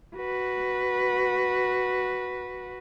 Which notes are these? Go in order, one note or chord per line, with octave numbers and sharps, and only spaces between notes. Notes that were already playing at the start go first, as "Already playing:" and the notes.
F#4 B4